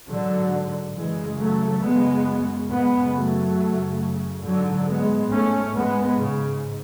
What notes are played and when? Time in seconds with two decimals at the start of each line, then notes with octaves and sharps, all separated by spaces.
0.09 G#2 D3 F#3
0.96 F#2 C#3 E3 G#3
1.40 F#3 A3
1.83 F#2 C#3 G#3 B3
2.70 F#2 C#3 G#3 B3
3.14 F#3 A3
3.57 F#2 C#3
4.44 G#2 D3 F#3
4.87 G#3 B3
5.31 G#2 A3 C#4
5.75 G#3 B3
6.18 G#2 C#3